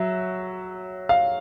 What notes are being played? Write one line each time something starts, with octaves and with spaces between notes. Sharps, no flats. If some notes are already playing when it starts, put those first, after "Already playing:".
Already playing: F#3 E5
F5